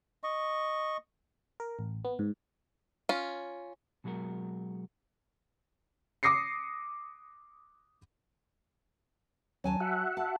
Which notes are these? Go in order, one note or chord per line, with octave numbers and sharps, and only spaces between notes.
D#5 C#6
A#4
A1
B3
G#2
C#4 F4
B2 F#3 G#3 F#4 A#4
D6 D#6 A#6 C7 C#7
D#2 F#3 C#4 G#5 A5
F#4 E5 F#5
A5